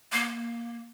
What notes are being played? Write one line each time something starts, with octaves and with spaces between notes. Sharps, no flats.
A#3